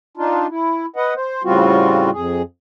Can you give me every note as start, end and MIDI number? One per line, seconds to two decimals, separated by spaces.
0.17 0.47 62
0.17 0.47 63
0.17 0.47 65
0.50 0.86 64
0.96 1.14 71
0.96 1.14 75
0.96 1.14 78
1.16 1.43 72
1.44 2.10 45
1.44 2.10 49
1.44 2.10 55
1.44 2.10 60
1.44 2.10 65
1.44 2.10 66
2.13 2.42 41
2.13 2.42 68